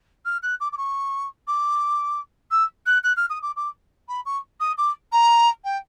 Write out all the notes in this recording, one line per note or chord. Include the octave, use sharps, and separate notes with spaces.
F6
F#6
D6
D6
C#6
D6
E6
F#6
F#6
F6
D#6
D6
D6
B5
C#6
D#6
D6
A#5
G5